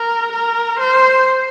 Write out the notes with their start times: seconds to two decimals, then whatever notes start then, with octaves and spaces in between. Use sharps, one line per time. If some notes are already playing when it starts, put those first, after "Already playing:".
Already playing: A#4
0.33 A#4
0.80 C5